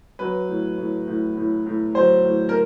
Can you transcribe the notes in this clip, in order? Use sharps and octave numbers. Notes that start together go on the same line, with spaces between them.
F#3 B4
A2
A2
A2
A2
A2
F#3 C5
A2
A#4